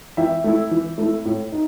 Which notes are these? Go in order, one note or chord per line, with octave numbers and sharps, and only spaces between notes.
E3 E5 G5
A3 E4
E3
A3 E4
A2
D#4